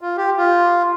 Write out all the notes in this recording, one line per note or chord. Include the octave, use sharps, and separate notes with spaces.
F4
G4
F4